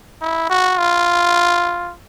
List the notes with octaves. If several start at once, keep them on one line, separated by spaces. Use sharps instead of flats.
E4
F#4
F4